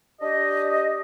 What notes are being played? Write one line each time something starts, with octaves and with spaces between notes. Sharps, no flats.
D4 G4 D#5